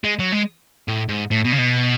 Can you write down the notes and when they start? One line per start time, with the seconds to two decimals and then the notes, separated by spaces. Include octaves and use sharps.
0.04 G#3
0.19 F#3
0.32 G#3
0.88 A2
1.09 G#2
1.31 A2
1.44 B2
1.52 C#3
1.58 B2